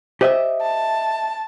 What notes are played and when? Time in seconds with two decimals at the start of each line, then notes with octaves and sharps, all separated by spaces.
0.21 G4 C5 D#5 E5
0.61 A5